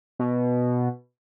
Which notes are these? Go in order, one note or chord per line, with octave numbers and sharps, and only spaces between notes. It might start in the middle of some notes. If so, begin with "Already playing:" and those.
B2